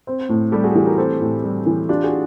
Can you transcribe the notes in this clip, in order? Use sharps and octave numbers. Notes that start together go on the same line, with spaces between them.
C4
A2
G3 G4 A4
F#4 G#4
E3 G4 A4
G#4 A#4
C4 G4 A4
A2
G3
E3
D4 F4 G4
F#4 G#4